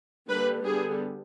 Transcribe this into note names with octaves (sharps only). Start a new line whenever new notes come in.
D3 G3 A#3 B4
D3 G3 B3 G#4